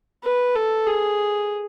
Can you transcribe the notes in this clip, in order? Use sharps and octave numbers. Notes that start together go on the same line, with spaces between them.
B4
A4
G#4